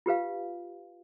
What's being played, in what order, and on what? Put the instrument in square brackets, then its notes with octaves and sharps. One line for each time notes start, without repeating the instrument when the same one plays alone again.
[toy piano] F4 G4 B4 F5